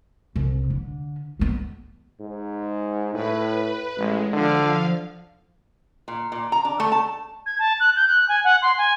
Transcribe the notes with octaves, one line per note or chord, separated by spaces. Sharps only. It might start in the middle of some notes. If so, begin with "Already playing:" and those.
C2
D3
D#3 B3
G#2
A2 B4
A1 G#3
D3 F3 F5
A#2
A#2
A#5
D4
A3
A5
G#6
A5
F#6
G6
F#6
G#5
F#5
C6
G#5